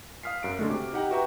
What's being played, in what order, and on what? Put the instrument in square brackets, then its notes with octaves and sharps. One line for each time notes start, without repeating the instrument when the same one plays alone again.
[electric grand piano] F5 D#6 F6 B6 C7
F#2 D7
D3 G#3 A3
C3 F#4 D6
D#4 G4 F#5 G5 A#5
F#4 B4 E5 G5 A#5